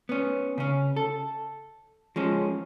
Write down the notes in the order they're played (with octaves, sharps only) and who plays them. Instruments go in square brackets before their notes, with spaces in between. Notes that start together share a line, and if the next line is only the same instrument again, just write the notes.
[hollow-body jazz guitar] B3 C#4
C#3 C#4
A4
F3 G#3 C#4